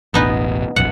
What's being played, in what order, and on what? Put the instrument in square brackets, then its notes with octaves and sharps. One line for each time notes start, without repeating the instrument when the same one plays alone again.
[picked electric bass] E1 A1 [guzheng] B3 D#4 B4
[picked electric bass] E1 A#1 F#2 [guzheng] F#5